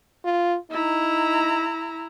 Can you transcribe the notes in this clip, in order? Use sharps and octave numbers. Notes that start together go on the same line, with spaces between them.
F4
D#4 E4 A#5